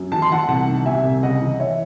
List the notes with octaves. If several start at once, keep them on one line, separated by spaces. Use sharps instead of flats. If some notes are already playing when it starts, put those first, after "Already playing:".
Already playing: F#2
E3 A5
C6
E3 F#5 A5
C2 F#5 A5
D#3
C3 E5 G#5
C2
C#3 D#5 F#5
E3
E3 C#5 E5